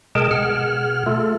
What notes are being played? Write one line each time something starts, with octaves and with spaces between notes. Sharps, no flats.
B2 G#3 G#4 A#4 G5 A5
B2 G#4 F#5 F6
A3 F4 A4